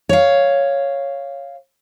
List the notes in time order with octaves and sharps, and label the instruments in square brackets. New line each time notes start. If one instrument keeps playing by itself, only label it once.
[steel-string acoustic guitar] C#5 F5